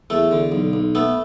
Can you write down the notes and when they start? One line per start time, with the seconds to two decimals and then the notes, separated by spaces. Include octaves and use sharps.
0.10 E2 A3 A4
0.31 D3
0.52 B1
0.73 B1
0.95 A3 B3 A4